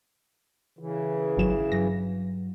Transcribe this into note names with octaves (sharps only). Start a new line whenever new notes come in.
C#3 E3
G#1 F#3 E7
G2 F#3 A#6